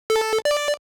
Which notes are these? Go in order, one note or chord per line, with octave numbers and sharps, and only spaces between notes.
A4
D5